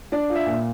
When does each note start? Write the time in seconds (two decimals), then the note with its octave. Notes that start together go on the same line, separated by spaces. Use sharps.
0.12 D4 D5
0.30 F4
0.35 E5
0.47 A#2